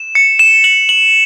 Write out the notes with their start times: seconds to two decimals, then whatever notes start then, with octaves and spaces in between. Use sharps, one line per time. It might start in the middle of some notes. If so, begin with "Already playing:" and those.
Already playing: E7
0.15 C#7
0.39 E7
0.64 F#7
0.89 F#7